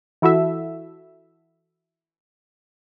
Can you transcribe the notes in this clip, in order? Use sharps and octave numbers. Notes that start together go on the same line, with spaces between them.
E3 E4 F#4 A4 E5